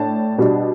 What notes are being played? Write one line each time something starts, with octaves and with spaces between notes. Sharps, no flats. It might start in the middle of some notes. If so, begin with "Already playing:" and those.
Already playing: A2 D4 A5
B2 G3 D4